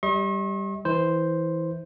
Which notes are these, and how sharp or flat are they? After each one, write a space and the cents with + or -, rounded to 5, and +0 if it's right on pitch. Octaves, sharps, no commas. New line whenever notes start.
G3 +0 D#5 +45 C#6 -45
E3 -15 E4 -15 C5 +0